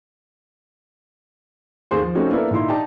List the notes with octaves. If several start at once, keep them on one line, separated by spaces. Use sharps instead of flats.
D#2 A3 G#4 C5 C6
F3
A3 C4 C#4 D#4 F#4
A#3 B3 D4 E4 A4
A#2 D#3 D#4 E4 C6
D4 D#4 G4 A5